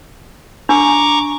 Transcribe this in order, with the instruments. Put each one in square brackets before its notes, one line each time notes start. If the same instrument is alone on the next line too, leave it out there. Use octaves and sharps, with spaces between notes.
[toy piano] D4 [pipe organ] A#5 C#6 D6